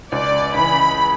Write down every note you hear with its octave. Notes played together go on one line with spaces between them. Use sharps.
C#2 D5
C#3 E3 B5